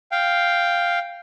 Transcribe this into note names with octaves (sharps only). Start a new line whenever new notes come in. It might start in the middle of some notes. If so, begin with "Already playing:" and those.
F5 G5